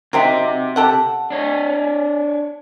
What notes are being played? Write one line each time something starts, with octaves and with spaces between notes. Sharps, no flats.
C3 F#3 C4 D#4 E5
G4 A4 F#5
D4 C#5